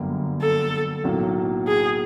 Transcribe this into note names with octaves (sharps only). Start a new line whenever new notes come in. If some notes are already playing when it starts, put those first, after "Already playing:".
Already playing: G1 F#2 D3 G3 A#3
A4
B1 A2 F#3 A#3
G#4